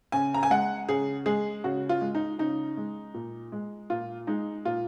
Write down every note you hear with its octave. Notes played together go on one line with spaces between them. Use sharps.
C#3 G#5
A#5
G#5
G#3 F#5
C#3 G#4
G#3 G#4
C#3 F#4
F4
G#3
D#4
C#3 D#4
G#3
A#2
G#3
A#2 F4
G#3 D#4
A#2 F4